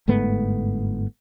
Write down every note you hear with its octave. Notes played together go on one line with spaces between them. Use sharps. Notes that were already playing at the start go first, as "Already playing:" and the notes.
G1 G#2 A3 B3